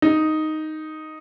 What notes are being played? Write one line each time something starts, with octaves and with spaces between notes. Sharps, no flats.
D#4